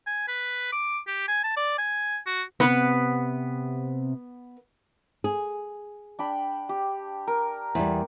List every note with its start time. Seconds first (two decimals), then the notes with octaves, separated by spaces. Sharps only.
0.07 G#5
0.28 B4
0.73 D6
1.08 G4
1.28 G#5
1.44 A5
1.57 D5
1.79 G#5
2.27 F#4
2.60 C3 B3 B4
5.24 G#4
6.19 D4 G5 B5
6.69 G4
7.27 A#4
7.75 E2 G3